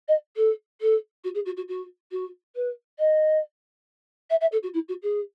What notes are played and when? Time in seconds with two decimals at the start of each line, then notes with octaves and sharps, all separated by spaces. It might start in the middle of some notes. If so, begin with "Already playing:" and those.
0.08 D#5
0.36 A4
0.81 A4
1.24 F#4
1.35 G#4
1.45 F#4
1.57 F#4
1.68 F#4
2.12 F#4
2.55 B4
2.99 D#5
4.30 E5
4.41 E5
4.52 A4
4.63 F#4
4.74 E4
4.88 F#4
5.03 G#4